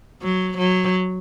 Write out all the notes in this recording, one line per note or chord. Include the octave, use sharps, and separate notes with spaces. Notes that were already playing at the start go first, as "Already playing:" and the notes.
F#3
F#3